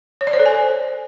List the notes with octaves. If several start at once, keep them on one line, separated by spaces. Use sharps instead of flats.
C#5
D5
C5
A4
G#5